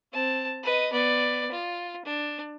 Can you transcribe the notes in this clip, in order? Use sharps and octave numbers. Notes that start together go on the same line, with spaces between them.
C4 A5
B4 D#5
B3 D5
F4
D4